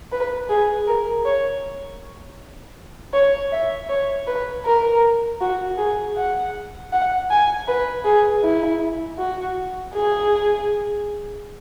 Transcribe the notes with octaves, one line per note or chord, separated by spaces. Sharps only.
B4
G#4
A#4
C#5
C#5
E5
C#5
B4
A#4
F#4
G#4
F#5
F#5
G#5
B4
G#4
E4
F#4
G#4